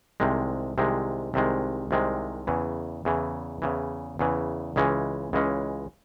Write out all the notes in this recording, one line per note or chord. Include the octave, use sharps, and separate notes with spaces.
C2 C3 D#3 G#3
C2 C3 D#3 G#3
C2 C3 D#3 G#3
C2 C3 D#3 G#3
E2 C#3 E3
E2 C#3 E3
E2 C#3 E3
E2 C#3 E3
C#2 C#3 E3 G#3 C#4
C#2 C#3 E3 G#3 C#4